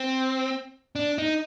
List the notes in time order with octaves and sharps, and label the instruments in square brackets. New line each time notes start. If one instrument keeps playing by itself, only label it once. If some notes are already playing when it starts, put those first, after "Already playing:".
Already playing: [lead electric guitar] C4
D4
D#4